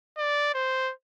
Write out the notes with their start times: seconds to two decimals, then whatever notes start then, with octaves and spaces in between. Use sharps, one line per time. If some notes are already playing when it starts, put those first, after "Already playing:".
0.18 D5
0.54 C5